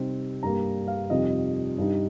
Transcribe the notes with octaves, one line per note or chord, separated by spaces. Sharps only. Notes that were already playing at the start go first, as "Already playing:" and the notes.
Already playing: C3 G3 C4 D#4
G2 G3 A#3 A#5
F5
F2 C3 G3 D#4 D#5
G2 G3 D#4